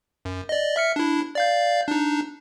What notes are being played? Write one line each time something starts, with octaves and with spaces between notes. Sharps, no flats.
F#2
D5 D#5
E5 F6 C#7
D4 E4
D5 F5 G6
D4 D#4